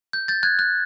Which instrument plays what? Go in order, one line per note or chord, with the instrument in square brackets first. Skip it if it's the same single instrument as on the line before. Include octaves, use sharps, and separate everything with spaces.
[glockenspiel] G6
G6 A6
F#6 G#6
F#6